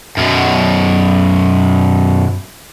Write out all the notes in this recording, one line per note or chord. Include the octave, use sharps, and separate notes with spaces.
F#2 B2